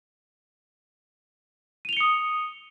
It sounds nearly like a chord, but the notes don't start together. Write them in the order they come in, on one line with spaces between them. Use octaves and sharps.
D#7 F7 G7 C#7 D#6